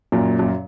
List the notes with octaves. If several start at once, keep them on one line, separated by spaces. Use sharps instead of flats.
F#2 A#2
F#2